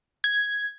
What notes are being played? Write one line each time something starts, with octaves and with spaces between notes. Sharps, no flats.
G#6